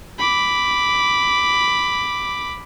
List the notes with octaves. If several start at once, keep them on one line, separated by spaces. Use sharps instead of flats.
B5 D6